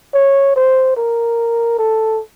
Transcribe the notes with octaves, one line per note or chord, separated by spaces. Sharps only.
C#5
C5
A#4
A4